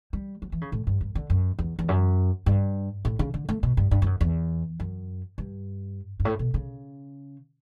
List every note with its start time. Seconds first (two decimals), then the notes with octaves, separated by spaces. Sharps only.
0.13 G3
0.42 F#3
0.52 E3
0.61 C#3
0.72 A2
0.87 G2
1.01 G2
1.15 D3
1.30 F#2
1.59 E2
1.79 E2
1.88 F#2
2.46 G2
3.05 A2
3.19 C#3
3.34 D3
3.49 A3
3.63 B2
3.77 G2
3.91 G2
4.02 G2
4.06 F#2
4.21 E2
4.80 F#2
5.38 G2
6.20 G2
6.25 A2
6.39 B2
6.54 C#3